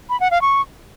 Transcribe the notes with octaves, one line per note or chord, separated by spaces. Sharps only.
B5
F#5
F5
C#6